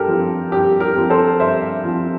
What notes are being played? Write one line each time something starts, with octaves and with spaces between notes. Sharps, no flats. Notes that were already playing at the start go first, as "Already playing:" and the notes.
Already playing: G2 G4 A4 A#4
F3 C4
G2 G4
G4 A#4
F3 C4
A4 C5
G2 C5 E5
F3 C4